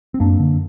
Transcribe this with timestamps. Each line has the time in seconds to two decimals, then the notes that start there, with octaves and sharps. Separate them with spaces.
0.14 C4
0.20 F#2 A#3 D4
0.40 D3